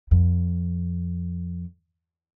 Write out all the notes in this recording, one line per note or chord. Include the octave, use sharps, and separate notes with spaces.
F2